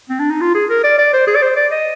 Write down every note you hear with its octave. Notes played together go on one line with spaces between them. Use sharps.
C4
D4
D#4
F4
G#4
A#4
D5
D5
C5
G#4
D5
C5
D5
D#5